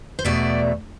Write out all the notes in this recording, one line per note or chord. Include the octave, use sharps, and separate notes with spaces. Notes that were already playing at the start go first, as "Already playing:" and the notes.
C5
E2 B2 A3 D5